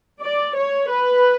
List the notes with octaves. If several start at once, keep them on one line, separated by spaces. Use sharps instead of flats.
D5
C#5
B4